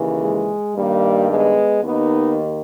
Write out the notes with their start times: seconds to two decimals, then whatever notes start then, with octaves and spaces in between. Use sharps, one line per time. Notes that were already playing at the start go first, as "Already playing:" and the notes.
Already playing: D#2 C#3 E3
0.22 G#3
0.76 G2 D#3 G3 A#3
1.30 G#3 B3
1.83 D#2 D#3 B3 D#4